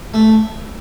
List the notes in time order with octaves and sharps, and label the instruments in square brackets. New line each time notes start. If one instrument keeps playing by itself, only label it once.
[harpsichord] A3